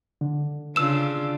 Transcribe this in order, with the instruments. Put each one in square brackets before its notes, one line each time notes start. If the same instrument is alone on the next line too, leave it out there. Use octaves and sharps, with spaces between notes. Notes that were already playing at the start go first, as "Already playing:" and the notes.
[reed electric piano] D3
[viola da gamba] C#3 D4 F4 [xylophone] E6 E7